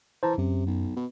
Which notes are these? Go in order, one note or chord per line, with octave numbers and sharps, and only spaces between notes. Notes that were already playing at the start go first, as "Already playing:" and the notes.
E3 C5 A5 A#5
F#2 C3
B1
B2